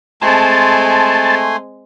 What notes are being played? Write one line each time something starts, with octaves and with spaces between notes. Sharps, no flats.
G#3 A3 C4 G#5 A5 C6